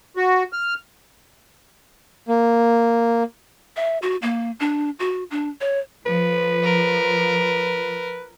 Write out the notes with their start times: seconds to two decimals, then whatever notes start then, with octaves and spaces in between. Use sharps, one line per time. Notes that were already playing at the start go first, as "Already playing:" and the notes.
0.17 F#4
0.53 F6
2.28 A#3
3.77 E5
4.02 F#4
4.22 A#3
4.60 D4
4.99 F#4
5.31 D4
5.61 C#5
6.06 F3 B4
6.64 A#4